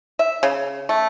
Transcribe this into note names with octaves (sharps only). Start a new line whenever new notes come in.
E5
C#3
A3